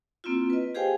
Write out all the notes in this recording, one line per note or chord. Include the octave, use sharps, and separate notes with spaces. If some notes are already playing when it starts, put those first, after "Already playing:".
A#3 C4 E4 F4
B4 D#5
G4 G#4 C5 F5 G5 G#5